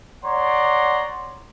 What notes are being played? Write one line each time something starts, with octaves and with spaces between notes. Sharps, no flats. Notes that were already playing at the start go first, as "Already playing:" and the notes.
C#5 D5 F#5 A#5 C6